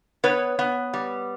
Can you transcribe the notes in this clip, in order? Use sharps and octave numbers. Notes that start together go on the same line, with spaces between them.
B3 B4 C#5
B3
G3